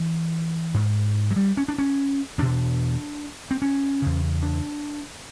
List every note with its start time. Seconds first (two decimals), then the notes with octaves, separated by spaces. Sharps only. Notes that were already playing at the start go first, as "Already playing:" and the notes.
Already playing: E3
0.74 G#2
1.31 F#3
1.36 G3
1.57 C#4
1.68 D4
1.78 C#4
2.38 E2 B2 D4
3.51 C4
3.62 C#4
4.02 E2 C#3
4.43 D4